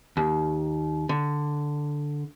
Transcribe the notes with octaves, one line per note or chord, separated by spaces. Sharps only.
D#2
D3